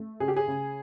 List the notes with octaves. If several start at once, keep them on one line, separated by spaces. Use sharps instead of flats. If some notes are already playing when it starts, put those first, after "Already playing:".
Already playing: A3
C#3 G#4
G4
G#4
C#3